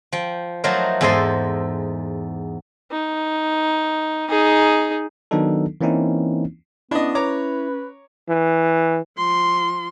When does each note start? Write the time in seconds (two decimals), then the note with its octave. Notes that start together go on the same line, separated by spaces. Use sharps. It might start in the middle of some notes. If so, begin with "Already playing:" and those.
0.12 F3 G5
0.64 F3 F#3 A3 D#4 A#4 C5
1.01 E2 G#2 A4 C5 D#5 C6
2.92 D#4
4.29 D#4 G#4
5.31 D#3 F#3 B3 D4 D#4 A4
5.81 E3 A#3 C4 C#4 D#4 E4
6.91 B3 C#4 D4 E4 D#5
7.15 B4 C#5 A#5 D6
8.29 E3
9.18 F3 C6